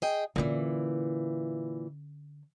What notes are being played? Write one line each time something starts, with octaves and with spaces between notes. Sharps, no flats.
G#4 D#5 G5
A#2 D3 E3 C#4